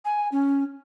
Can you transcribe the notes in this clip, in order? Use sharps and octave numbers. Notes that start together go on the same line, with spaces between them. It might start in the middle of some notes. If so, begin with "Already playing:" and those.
G#5
C#4